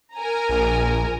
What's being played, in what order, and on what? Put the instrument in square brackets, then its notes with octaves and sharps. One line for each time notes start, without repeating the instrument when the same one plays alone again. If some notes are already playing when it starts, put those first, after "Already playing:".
[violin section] A#4 G#5 A#5
[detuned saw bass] A#1